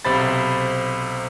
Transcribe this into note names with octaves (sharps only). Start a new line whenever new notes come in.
B1 C3 C5 B5 A6